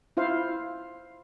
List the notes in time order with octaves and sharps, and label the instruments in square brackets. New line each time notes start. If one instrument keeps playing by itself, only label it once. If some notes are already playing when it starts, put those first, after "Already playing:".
[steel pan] E4 F4 C5 F5